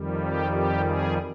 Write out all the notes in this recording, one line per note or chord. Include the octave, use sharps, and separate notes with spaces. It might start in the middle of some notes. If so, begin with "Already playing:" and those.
Already playing: F2 D#3 G3
G4
G4
G#4